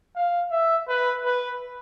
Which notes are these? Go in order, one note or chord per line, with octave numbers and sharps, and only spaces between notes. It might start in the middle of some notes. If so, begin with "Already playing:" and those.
F5
E5
B4
B4